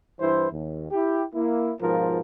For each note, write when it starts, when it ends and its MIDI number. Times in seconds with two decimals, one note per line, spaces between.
0.20 0.48 43
0.20 0.48 52
0.20 0.48 64
0.20 0.48 72
0.51 0.86 39
0.91 1.22 64
0.91 1.22 67
1.34 1.71 58
1.34 1.71 64
1.80 2.19 44
1.80 2.19 47
1.80 2.19 53
1.80 2.19 65
1.80 2.19 70